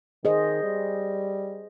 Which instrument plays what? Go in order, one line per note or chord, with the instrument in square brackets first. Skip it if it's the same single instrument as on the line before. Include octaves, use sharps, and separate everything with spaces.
[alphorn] D#3 [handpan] G#4 C5 D#5
[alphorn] G3